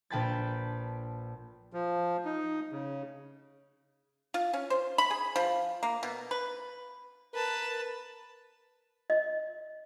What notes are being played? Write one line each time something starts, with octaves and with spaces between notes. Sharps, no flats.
A#1 B4 G5 A5 B5 A6
F3
D#4
C#3
F4
C#4
C5
B5
G#4
F3
A#3
B2
B4
A#4 B4 A5
D#5